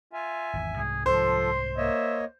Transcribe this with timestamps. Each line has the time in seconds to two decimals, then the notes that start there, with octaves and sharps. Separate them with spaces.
0.13 F4 E5 G#5
0.53 G#1 E2
0.77 C2 G#2 G3 G#4
1.06 F3 A4 C5 C6
1.77 A#3 C#5 D#5 E5